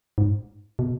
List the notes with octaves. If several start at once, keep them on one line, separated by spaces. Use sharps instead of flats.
G#2
B2